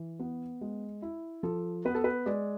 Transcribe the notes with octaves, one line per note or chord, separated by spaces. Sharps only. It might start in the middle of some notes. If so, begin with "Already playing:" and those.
Already playing: E3
B3
G#3
E4
F3 A4
B3 B4
A4
B4
G#3 D5